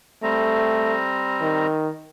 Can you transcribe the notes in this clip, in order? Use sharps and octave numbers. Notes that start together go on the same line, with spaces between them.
G3 A3 C4 A#5
D#3